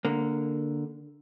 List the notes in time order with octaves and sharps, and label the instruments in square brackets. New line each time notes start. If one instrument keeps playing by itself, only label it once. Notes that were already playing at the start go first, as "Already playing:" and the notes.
[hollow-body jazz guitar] D3 A#3